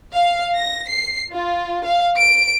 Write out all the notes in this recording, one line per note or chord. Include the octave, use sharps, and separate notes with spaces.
F5
A#6
C7
F4
F5
D7